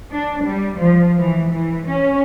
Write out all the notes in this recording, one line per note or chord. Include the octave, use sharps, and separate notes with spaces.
D4
G3
F3
E3
E3
C#4